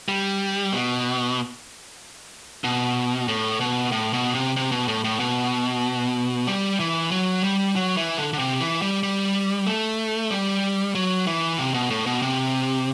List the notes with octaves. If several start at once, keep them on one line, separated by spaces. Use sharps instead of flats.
G3
B2
B2
A2
B2
A2
B2
C3
C3
B2
A2
A2
B2
G3
E3
F#3
G3
F#3
E3
D3
D3
C3
E3
G3
G3
A3
G3
F#3
E3
C3
B2
A2
B2
C3